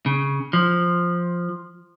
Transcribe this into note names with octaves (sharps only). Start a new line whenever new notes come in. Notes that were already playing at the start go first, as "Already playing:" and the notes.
C#3
F3